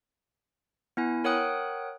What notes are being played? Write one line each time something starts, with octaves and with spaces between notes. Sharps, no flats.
B3 E4 G#5
A#4 C#5 F#5 G5 D#6 F#6